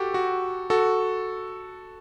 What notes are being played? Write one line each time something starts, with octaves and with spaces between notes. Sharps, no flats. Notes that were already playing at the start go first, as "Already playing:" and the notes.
Already playing: F#4 G4 A4
F#4
F#4 A4